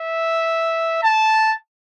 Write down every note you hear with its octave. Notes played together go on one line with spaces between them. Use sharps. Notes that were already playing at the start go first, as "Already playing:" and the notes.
Already playing: E5
A5